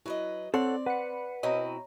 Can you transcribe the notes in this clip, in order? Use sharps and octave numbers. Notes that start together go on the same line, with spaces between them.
F#3 E4 B4 D#5
C4 A4 C#5 D5 F#5
B4 F#5 B5 C#7
B2 C4 E4 C#5 D#5 A#5